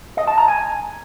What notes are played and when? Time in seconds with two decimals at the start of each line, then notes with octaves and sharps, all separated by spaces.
0.17 D#5
0.27 A5
0.38 A#5
0.48 G#5